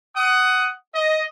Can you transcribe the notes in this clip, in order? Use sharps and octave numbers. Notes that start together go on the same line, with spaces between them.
F#5 D#6
D#5